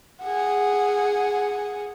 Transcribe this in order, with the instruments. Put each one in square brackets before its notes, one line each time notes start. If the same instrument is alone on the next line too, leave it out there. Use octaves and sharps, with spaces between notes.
[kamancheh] G#4 F#5